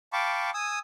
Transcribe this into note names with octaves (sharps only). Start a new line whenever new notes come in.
F5 G5 A5 B5 C#6 D6
G#5 D#6 E6